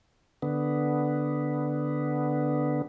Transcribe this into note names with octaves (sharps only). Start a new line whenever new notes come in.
D3 B3